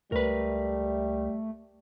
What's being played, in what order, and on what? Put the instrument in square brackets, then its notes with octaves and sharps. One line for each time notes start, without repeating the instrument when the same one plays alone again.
[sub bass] C#2 [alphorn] G3 [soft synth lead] A3 [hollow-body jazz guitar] A#4 B4